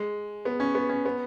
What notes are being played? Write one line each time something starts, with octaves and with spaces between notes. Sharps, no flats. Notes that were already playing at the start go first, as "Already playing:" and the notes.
Already playing: G#3
B3
C#4
B3
C#4
B3